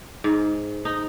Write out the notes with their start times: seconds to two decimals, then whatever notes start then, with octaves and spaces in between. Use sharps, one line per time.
0.24 G#2
0.85 D#4